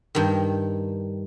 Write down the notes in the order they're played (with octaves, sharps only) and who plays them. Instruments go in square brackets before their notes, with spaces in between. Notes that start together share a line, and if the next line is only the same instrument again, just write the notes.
[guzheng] G2 D#3